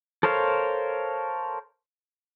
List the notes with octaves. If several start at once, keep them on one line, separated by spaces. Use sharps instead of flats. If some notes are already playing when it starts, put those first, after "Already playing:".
A4 A#4 C5 C#5 F5